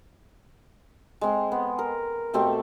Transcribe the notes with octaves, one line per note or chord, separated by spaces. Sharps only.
G#3 C4
B3
A#4
B2 A3 C4 G4